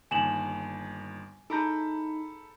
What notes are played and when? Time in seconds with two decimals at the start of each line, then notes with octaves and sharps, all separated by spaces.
0.11 G1 D#2 G#5 E7 F#7
1.50 D#4 E4 G#4 A4 A#5 B5 D6 G6